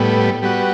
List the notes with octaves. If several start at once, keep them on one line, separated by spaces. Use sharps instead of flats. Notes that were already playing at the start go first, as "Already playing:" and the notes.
Already playing: A2 G3 B3
G3 B3 F#4